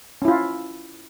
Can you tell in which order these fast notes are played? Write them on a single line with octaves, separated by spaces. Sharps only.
C#4 E4 F4